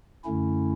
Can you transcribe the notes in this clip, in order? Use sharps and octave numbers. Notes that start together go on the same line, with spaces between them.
F#2 D3 A3 C#4 E4